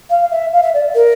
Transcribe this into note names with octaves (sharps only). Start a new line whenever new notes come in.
F5
E5
F5
E5
D5
A#4